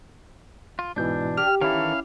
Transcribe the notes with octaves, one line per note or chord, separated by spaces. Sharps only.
F4
G#2 B2 E3 D4 G6
G4 F6
D#3 E3 C#4 E4 A4 F5